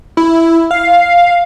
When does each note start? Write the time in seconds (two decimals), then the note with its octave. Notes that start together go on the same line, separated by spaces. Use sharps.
0.17 E4
0.71 F5